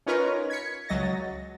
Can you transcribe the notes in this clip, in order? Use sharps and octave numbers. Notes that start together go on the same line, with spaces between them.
C#4 D#4 F4 A#4 B4 C#5
G#6 B6 C#7
C#2 F#3 D#5 A6 A#6